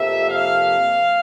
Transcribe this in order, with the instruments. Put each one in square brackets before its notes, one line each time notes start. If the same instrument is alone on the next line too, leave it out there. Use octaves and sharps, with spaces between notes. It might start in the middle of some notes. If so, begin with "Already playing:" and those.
Already playing: [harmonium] F2 C3 F3 A#3 [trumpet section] E5
[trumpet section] F5